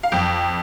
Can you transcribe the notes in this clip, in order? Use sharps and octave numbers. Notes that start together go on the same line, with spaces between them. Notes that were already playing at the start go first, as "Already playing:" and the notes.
F5
F2 G5